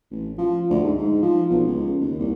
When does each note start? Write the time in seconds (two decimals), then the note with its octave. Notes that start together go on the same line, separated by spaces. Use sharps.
0.11 A1
0.38 F3
0.70 D2
0.84 G#2
0.98 G#2
1.23 F3
1.50 B1
1.67 C#2
2.01 D#2
2.19 C2